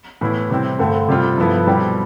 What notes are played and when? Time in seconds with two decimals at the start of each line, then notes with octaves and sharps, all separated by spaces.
0.21 A2 E3 B3 E4
0.50 C3 G3 C4 E4
0.79 G2 D3 A3 C4
1.09 C3 G3 C4 F4
1.38 G2 F3 B3 E4 A4
1.67 B2 G3 C4 E4 G4